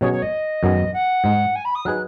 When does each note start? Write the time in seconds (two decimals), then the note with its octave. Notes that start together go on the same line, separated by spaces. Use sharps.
0.01 B2 F#3 C#4 G#4 C#5
0.12 C#5
0.22 D#5
0.63 F#2 D#3 F#3 B3 G#4
0.93 F#5
1.24 G#2 G#3 D#4
1.55 G#5
1.64 B5
1.75 D#6
1.85 F#3 D#4 G#4 B4 F#6